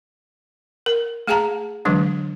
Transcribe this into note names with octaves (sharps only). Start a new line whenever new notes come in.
A#4
A3 G#4 F5 G5 A5 A#5
D3 E3 F#3 G#3 D4